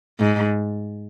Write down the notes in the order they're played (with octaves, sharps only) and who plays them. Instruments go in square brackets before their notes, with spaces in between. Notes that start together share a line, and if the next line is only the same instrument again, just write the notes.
[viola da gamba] G#2